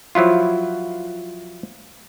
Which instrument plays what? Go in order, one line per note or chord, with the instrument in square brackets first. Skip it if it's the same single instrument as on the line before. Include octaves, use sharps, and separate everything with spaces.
[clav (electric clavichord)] F3 F#3 E4 F4